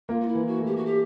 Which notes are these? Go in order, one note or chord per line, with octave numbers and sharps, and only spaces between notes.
A#3 F4
F4
E4
E3
F#4
A3
G4
F#4
G4